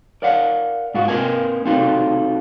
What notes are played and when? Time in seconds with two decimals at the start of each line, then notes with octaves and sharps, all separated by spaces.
0.22 A#4 D5 F5 F#5
0.94 G#2 F4 F#4
1.08 C4 A#4 B4 G#5
1.65 C4 D#4 F4 F#4 A4